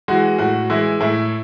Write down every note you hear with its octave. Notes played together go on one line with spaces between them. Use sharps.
E3 G#3 F#4
A2 F#4
E3 G#3 E4
A2 E4